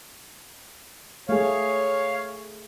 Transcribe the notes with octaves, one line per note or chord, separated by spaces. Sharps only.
A3 G#4 C#5 F5